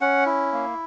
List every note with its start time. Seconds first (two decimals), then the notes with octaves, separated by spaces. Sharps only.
0.01 C#4 F#5
0.26 E4
0.52 A#3